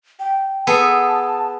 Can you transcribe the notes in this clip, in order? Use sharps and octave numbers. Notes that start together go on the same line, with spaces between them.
G5
B3 G#4 A4 A5